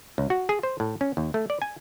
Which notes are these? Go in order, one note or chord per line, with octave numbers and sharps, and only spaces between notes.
C#2
F#4
G#4
C5
A2
C#4
D#2
A3
D5
G#5